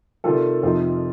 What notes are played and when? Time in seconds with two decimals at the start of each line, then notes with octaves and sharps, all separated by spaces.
0.24 C3 D#3 G3 F4 A4
0.63 F2 C3 F3 C4 D#4 F4